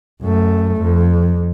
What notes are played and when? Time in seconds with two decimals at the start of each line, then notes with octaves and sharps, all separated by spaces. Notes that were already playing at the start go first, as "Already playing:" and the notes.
0.23 F#2 A3
0.82 F2